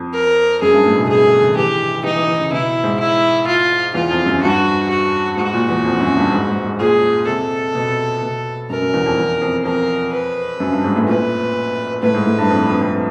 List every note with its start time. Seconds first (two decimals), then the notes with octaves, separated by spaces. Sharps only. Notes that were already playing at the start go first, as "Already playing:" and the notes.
Already playing: F2
0.14 A#4
0.62 F#2 G#4
0.74 G2
0.86 A2
0.97 B2
1.09 C3 G#4
1.25 D3
1.41 D#3
1.57 E3 G4
2.04 E3 D#4
2.16 E3
2.28 E3
2.40 C#3
2.52 B2 E4
2.84 G#2
3.00 E4
3.47 F4
3.94 E2 F4
4.11 F2
4.26 F#2
4.42 G2 F#4
4.90 F#4
5.37 G#2 F#4
5.53 A#2
5.69 E2
5.85 F2
6.00 F#2
6.17 G2
6.32 G#2
6.48 G#2
6.64 G#2
6.80 A#2 G#4
7.27 C3 A4
7.75 B2
8.22 B2
8.70 F#2 A#4
8.81 F#2
8.94 E2
9.06 F2
9.17 E2
9.41 F2
9.65 F2 A#4
10.12 B4
10.60 F#2
10.72 G2
10.84 G#2
10.96 A2
11.07 A#2 B4
12.03 A2 B4
12.14 G#2
12.26 A2
12.38 G2
12.50 F2
12.66 F2
12.81 F2